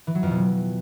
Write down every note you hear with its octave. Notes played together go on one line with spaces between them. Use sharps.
E3
F#3
F2
B2